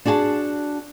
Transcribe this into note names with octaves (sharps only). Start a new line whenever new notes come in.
D4 F#4 G#4 G#5 A5